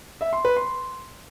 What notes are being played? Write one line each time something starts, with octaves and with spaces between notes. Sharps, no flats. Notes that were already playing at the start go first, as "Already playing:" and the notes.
E5
C6
B4
C6